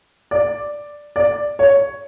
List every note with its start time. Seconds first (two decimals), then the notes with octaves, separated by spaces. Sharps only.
0.31 D5
1.16 D5
1.59 C#5